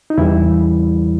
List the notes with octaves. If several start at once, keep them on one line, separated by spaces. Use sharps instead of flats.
D#4
E2 C#3 E3 G3 E4